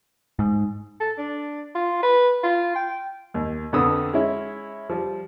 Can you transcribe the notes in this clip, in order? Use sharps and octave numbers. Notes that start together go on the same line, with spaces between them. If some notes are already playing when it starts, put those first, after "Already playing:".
G#2
A4
D4
F4
B4
F4
G5
D#2
F2 D3 B3 A4 D#6 E6
G#3 C#4 E4
F3 G3